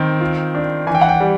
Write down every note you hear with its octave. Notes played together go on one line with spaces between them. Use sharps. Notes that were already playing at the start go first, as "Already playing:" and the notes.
Already playing: D#3 C4
F4
D4
E3 G#5
G5
F#5
G5
G3